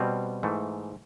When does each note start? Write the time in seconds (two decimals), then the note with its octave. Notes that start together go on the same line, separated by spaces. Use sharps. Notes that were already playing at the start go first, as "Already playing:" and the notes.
Already playing: B2 G3 C4
0.43 G#2 E3 A3